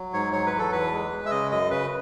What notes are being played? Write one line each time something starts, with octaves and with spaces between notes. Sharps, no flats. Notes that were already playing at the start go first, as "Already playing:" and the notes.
Already playing: F#3
G#2 C#5
F#3 C#5
B4
E2
A4
E2 B4
G#3
G#3
E5
C#3 D#5
F#2 D#5
C#3 B4